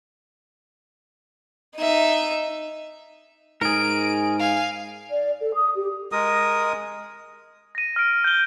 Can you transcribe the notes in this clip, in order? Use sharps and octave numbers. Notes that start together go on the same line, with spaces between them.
D#4 E5
G#2 G#4 A#4 D7
F5 G#5
D5
A4
D#6
G4
G#3 A#4 D#6
A#6 D#7
F6 D7
G6 G7